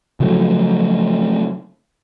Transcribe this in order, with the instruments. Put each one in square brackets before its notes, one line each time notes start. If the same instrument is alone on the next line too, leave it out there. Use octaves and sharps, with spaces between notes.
[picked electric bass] C#3 F3 F#3 A3